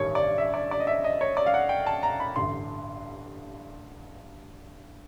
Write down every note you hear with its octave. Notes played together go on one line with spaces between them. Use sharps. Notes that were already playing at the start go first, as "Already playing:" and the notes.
Already playing: A1 G2 D#3 G3 C#5
D5
E5
D5
D5
D#5
E5
D#5
C#5
D5
F5
F#5
G5
A5
A#5
B5
A1 G2 D3 C6